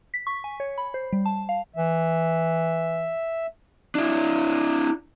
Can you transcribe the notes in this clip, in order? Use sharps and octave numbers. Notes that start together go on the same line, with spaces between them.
B6
C#6
G#5
C#5
B5
C5
G3
A5
F5
E3 E5
D4 E4